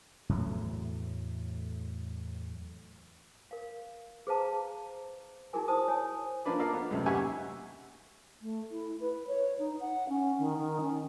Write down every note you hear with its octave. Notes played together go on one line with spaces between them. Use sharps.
E2 A2 F#3 A3
A#4 F5
G#4 B4 C5 F5 A5 A#5
D#4 E4 F#4 G#4 A#4 G#5
C5 A5 D#6
C#5 G#5
F3 A#3 D4 B4 D5
F4 A4 A#4 D5 D#5 F5
B3
C#2 F#2 A2 C3
D#2 G4 E5 F#5 G#5 C#6
A3
E4
B4
C#5
D#4
F#5
C#4
D#3
D#3
C#4